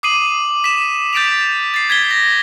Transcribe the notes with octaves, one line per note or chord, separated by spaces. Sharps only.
D6 D#6 C7 D#7 F#7
B6 E7
G6 A6 B6 D7 E7 F7
A6 C7
G#6 B6 G7
A#6